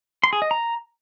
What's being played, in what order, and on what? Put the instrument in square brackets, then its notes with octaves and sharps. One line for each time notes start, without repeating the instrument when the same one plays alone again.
[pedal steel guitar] C6
G#4
D#5
A#5